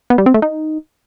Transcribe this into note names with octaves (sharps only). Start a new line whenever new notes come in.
B3
G3
C4
A3
D#4